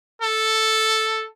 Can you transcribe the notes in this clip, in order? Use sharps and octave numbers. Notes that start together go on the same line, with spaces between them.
A4